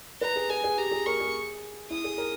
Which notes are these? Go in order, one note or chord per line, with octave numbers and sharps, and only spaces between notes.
B4 A#5
G#4
G#4 G#5
G#4
G4 A#5
G#4
A#4 C#6
G#4
E4 D#6
G#4
A#4